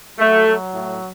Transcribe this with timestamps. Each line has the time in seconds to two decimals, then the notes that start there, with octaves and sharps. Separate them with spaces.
0.18 F#3 A3
0.46 F#3
0.74 A2